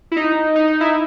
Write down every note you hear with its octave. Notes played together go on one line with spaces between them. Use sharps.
E4
D#4
D#4
D#4
E4